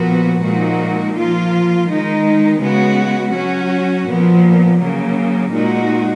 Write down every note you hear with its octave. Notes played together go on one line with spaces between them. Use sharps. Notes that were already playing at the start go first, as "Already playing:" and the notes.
Already playing: A#2 F3 B3 F#4
A#2 F3 G#3 D#4 F#4
F3 A#3 F4
D#3 G#3 D#4
C#3 G#3 B3 F#4
F#3 C#4 F#4
A#2 F3 B3
C#3 F#3 A#3
A#2 G#3 D#4 F#4